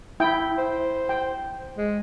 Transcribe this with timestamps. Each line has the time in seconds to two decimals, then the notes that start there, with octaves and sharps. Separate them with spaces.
0.20 E4 G5
0.58 C5
1.09 G5
1.77 G#3